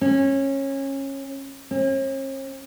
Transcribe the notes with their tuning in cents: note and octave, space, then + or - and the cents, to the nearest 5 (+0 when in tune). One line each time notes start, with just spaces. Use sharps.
C#4 -20
C#4 -45